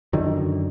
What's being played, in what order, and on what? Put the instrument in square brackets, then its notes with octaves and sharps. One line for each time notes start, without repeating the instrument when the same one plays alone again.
[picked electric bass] F#2 D3 D#3